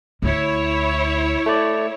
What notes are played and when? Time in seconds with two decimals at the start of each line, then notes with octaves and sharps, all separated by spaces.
0.22 D2 E4 C#5
1.46 A3 D5